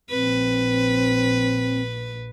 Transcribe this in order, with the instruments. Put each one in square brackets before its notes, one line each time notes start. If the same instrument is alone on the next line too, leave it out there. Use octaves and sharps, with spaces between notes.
[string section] A#1 [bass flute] C4 [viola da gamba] B4